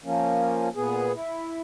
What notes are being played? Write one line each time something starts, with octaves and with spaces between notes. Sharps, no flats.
F3 A#3 C#4
A#2 B3 G#4
E4